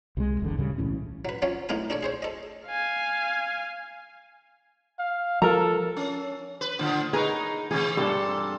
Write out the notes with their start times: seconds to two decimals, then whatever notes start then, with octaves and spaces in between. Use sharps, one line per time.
0.17 C2 F3 G#3
0.40 F1 E2 G#2 D3
0.57 D2 A2 C#3 G3
0.78 B1 A2 E3 C#4
1.25 F#3 B4
1.42 F3 F#3 C#4 C#5
1.69 B1 A2 A#3 D#4 A#4 G#5
1.90 D4 A4 C#5 D5
2.03 G#4 C5 C#5
2.22 A4 D#5
2.66 F5 G#5
4.99 F5
5.42 F3 A4 A#4 A#5
5.97 C#4
6.61 B4
6.79 A2 D3 F3
7.13 D#4 G#4 A#4 B4 C#5
7.71 C3 E3 G#4 C#5
7.97 G2 A#2 C4 D4 A4